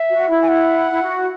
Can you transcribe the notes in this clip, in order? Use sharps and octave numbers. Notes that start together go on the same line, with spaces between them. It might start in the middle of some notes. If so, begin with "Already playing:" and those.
Already playing: E5
F#4
E4
G#5
F#5
E4
F#4